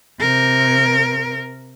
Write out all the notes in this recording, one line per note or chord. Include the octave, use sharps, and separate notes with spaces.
C3 A#4